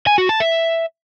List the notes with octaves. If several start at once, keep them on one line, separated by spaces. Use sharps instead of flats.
G#5
F#4
A5
E5